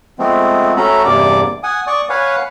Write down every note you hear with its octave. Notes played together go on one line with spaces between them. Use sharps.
F3 G#3 A3 B3 C4
A3 C#4 F#4 A4 A#5 B5
E2 G2 C3 A#3 D5 D6
F#5 G#5 D#6
D5 C#6 D#6
B4 C#5 F5 F#5 G#5